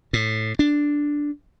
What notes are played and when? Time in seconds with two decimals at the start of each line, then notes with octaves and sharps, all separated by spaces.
0.13 A2
0.59 D4